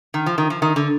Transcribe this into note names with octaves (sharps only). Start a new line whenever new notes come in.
D#3
F3
D#3
F3
D#3
D3